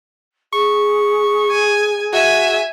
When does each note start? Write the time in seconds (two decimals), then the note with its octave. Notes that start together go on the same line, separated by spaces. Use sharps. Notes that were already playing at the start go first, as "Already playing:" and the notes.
0.53 G#4 C#6
1.51 G#5
2.13 F#4 E5 G#5